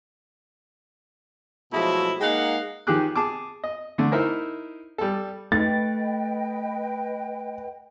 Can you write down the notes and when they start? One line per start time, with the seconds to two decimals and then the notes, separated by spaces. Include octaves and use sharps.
1.73 B2 F3 F#3 G#3 A3 E4
2.21 G#3 A#3 D#4 F5 F#5
2.87 D#3 F3 G4 G#4 D6 F#6
3.16 G#4 A5 D6
3.64 D#5
3.98 D3 A3
4.12 D#4 E4 A#4 C5 E5
4.98 G3 A4
5.52 A3 B4 D#5 G5 A6